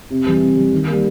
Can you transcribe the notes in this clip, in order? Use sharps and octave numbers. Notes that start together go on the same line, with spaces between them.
C3
E3 G3
C3
E3 G3
D#3
G3 A#3